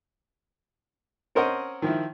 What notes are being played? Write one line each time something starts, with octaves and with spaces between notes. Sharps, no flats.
C4 C#4 A#4 C5 D#5 F#5
D#3 F3 E4